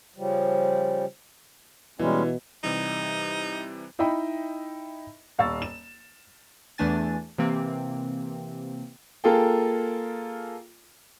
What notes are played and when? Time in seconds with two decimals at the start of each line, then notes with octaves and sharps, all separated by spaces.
0.16 C#3 F3 G3
1.99 B2 E3 G3 G#3 C#4
2.64 C3 E3 G3 D#4
3.99 D#4 E4 D#5 E5 G5 B5
5.39 D#1 F5 C#6 E6 A6
5.62 E7
6.78 E2 E3 A3 D4 G#5 A6
7.38 C3 E3 A#3 C4
9.24 A#3 F4 G#4 A4 G5